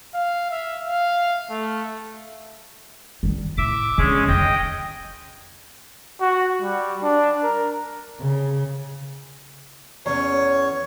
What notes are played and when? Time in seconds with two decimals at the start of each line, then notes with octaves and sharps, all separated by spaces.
0.14 F5
0.51 E5
0.87 F5
1.50 A3
3.23 D#3 G3
3.58 A2 E5 D6
3.98 D3 G#3 C#4 G#4
4.28 F2 D#3 D#5 G5
6.21 F#4
6.62 G3
7.03 D4
7.43 A#4
8.20 C#3
10.06 E2 C#4 C#5